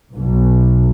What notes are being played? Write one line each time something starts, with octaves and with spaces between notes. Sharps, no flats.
B1